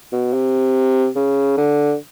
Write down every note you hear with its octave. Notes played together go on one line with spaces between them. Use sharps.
B2
C3
C#3
D3